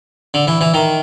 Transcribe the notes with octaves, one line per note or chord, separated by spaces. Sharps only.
D3
E3
E3
D#3